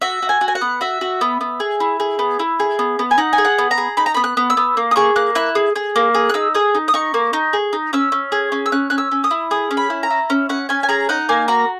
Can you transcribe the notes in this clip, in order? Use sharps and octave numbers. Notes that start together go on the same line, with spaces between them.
F#4 E5
F#4
G#5
F#4
G#5
F#5
B3
F#4 E5
F#4
B3
B3
G#4
E4
G#4
B3
E4
G#4
B3
B3
G#5
D#4 F#5
G#5
G#4
F#5
B3
A#5
G#4
D#4 B5
A#5
B3 B5
F#6
B3
E6
B3
A#3
D#6
G#4 C#6
A#3 F#6
E4 F#6
G#4
G#4
A#3
G#4
F#6
D#4 E6
G#4 D#6
D#4
D#6
D#4 C#6
A#3
D#4
G#4
D#4
C#4 E6
C#4
G#4
C#4
E6
C#4 F#6
C#4 F#6
E6
C#4
D#6
E4
G#4 D#6
C#4
B5
E4
A#5
E4
C#4
C#4 F#5
C#4 G#5
G#5
G#4 A#5
D#4 F#5
A#3 G#5
F#4 A#5